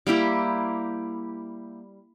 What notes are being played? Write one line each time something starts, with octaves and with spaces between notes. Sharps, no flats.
G3 A#3 E4 G4